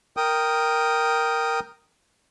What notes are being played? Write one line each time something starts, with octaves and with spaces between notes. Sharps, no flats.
A#4 G5 D#6